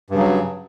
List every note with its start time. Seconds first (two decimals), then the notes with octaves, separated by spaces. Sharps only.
0.10 G2
0.14 C#3
0.18 F#3